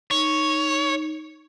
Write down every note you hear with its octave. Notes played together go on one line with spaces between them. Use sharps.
D#4 C#5